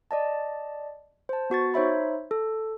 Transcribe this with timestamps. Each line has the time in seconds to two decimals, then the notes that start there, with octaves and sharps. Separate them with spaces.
0.11 D5 D#5 A5
1.29 C5 A5
1.50 B3 F#4 C#6 A6
1.74 D#4 C5 C#5 E5 B5
2.31 A4